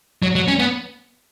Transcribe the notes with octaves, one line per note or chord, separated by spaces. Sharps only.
F#3
F#3
C#4
B3